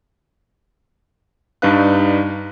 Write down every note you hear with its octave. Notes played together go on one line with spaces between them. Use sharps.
G2 D4 D#4 B4 F5 F#6